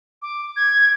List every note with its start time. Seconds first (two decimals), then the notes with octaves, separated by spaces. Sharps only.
0.22 D6
0.57 G#6